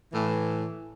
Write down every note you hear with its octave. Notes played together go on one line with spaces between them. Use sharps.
A2 E3